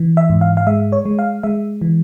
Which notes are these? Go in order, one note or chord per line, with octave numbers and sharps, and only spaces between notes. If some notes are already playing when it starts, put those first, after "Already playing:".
Already playing: E3
E5
G#2
F5
F5
G#3 E5
C#5
G#3
F5
G#3 E5
E3